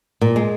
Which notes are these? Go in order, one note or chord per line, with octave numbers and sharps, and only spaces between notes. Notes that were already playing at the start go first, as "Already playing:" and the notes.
A#2
G#3